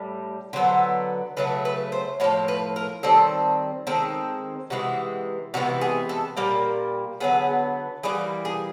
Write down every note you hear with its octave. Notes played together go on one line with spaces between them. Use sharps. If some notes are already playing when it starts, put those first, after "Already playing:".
Already playing: A2 G3
D3 F#3 B3 C5
C#3 F#3 A3 B4
B4
C5
A2 F3 A#3 C#5
B4
A#4
D#3 G3 C4 A4
D#3 G#3 C4 A4
C3 E3 G#3 F#4
C3 E3 G#3 B3 F#4
G#4
A4
A#2 G3 A#3 A#4
D3 F#3 B3 G#4
E3 G3 A#3 G#4
G#4